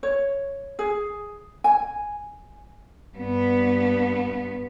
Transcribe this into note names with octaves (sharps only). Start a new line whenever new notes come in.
C#5
G#4
G#5
G2 B3